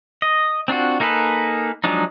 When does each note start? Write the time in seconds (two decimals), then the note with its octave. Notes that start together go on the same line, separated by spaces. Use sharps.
0.22 D#5
0.68 C4 D4 F4 F#4
1.00 A#3 D#4 G#4 A4 B4
1.84 F3 F#3 G#3 D4 D#4